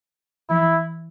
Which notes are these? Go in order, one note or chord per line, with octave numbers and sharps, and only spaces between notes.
E3 E4